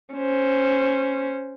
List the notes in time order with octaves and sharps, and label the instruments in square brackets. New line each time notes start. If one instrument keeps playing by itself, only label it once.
[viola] C#4 C5